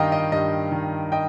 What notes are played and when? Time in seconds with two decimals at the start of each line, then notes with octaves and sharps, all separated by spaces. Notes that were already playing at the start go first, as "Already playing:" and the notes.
Already playing: G2 D#3 D#5 F5 G5 A#5
0.12 D#5
0.32 G2 D#5
0.72 D#3
1.12 D#5 G5